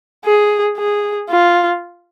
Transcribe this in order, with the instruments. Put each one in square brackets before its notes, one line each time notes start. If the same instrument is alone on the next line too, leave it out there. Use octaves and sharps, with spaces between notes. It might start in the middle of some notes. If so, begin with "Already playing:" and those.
[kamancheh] G#4
G#4
F4